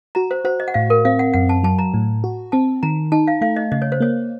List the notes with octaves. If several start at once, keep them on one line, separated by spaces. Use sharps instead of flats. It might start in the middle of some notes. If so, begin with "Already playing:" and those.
F#4 A#5
C5
F#4 C5
D#5
F#5
A2 F5
A#4
C4 F5
F#5
F#2 F#5
A5
F#3 A5
A#5
A2
F#4
C4 A5
D#3 A#5
D#4 A5
F5
A3 F5
D#5
C#3 D#5
C#5
C5
A#3 C#5